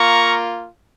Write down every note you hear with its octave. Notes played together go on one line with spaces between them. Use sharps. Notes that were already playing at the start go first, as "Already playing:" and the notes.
Already playing: A#3 F4 A#5 C#6